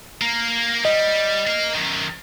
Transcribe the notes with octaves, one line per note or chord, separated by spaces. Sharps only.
A#3 A#4
G3 D#5
A#4 F5
F#2 D#3